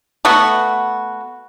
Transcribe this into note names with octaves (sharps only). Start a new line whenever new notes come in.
A3 B3 F#4